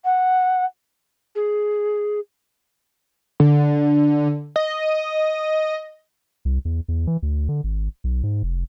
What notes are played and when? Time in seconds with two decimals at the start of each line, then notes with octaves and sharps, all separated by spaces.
0.05 F#5
1.35 G#4
3.40 D3
4.56 D#5
6.45 C2
6.65 E2
6.88 E2
7.07 E3
7.23 D2
7.49 D3
7.64 G#1
8.04 B1
8.23 G#2
8.43 F1